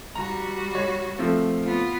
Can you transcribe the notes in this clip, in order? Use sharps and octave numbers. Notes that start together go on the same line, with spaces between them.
G3 F#4 A#5
C#5
F3 A3 C4
B3 F4